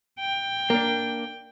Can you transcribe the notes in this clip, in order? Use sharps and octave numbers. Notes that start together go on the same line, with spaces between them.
G5
A#3 D4